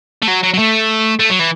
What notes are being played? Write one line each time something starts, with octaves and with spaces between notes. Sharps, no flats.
A3
F#3
F#3
F#3
A3
A3
F#3
E3